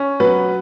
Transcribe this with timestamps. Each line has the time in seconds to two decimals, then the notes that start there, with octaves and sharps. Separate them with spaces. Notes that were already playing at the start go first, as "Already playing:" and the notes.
Already playing: C#4
0.20 F#3 B3 B4